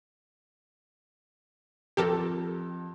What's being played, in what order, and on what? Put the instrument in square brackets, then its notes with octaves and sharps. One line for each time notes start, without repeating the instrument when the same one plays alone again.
[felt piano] F2 [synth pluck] G4 A4 A#4